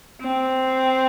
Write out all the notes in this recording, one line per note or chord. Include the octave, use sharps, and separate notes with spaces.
C4